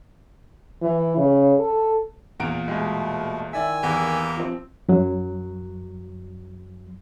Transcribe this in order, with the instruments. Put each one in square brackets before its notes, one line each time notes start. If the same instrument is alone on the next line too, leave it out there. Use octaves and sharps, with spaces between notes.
[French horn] E3
C#3
A4
[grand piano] E2 A#2 D7 [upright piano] A#5
[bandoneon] B2 A3 [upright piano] G#3 G4
[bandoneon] D#3 G#5 E6 [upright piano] E4 D5 E5
[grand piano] E2 [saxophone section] E3 A#3 G4
[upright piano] F3 C4
[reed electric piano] F#2 F#3